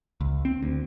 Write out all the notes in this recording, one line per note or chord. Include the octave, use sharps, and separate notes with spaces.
C#2
C4
D2